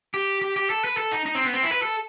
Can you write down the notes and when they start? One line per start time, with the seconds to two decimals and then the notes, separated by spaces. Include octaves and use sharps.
0.14 G4
0.42 G4
0.56 G4
0.70 A4
0.84 B4
0.97 A4
1.12 D#4
1.26 D#4
1.35 C4
1.45 B3
1.54 C4
1.63 E4
1.72 B4
1.82 A4